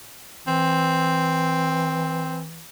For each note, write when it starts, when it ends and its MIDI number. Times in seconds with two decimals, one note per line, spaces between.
0.47 2.65 52
0.47 2.41 60